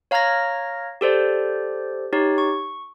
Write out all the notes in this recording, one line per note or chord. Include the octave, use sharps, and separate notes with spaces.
C#5 F5 A#5 F6 G#6 A#6
G4 A4 C5 D5
D#4 G4 C#5
C#6